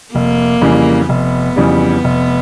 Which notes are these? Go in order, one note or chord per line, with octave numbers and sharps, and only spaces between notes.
F1 A#3
F2 C#3 E3 G3
F1 B3
F2 C#3 E3 G3
F1